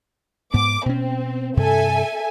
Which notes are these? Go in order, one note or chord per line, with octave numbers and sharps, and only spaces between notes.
G#2 B3 D6
B2 C4 C#4
G2 C3 A4 E5 G#5